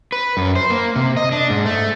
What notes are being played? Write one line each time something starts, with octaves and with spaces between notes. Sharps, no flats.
B4
F#2
C5
A#3
C3
D#5
D4
G#2
A3